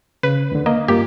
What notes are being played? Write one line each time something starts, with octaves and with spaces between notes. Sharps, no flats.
C#3 B4
D2 D3
A#3 D#5
G2 A#3 F4 G4